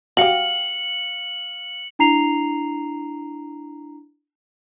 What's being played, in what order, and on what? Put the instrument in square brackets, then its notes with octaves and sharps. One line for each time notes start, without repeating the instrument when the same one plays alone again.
[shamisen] F#4 G4 [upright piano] F5 [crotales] C#7 F#7
[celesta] D4 E4 A#5 C7 F7